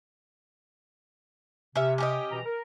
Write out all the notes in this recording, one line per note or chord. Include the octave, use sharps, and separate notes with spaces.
C3 C#4 E5
C#4 G4 D#5
B2 E3 A#5
A#4